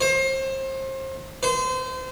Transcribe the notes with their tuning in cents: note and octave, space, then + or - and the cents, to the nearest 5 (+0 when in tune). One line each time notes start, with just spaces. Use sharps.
C5 +30
C5 -30